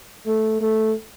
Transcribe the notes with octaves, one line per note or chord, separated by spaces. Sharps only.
A3
A3